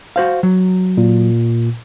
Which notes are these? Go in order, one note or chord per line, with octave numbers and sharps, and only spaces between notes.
F#4 C5 F5
F#3
A#2